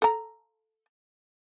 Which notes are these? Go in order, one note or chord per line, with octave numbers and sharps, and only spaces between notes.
A4 A#5